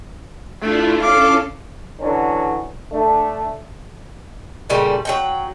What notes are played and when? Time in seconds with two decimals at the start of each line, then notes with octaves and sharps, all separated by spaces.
0.62 A3 D4 E4 F4
1.02 C#4 A4 F5 D6
2.00 D3 E3 F#3 C#4 D4
2.92 A3 D4
4.70 A#2 C#3 G3 A3
5.05 F#3 F#5 G5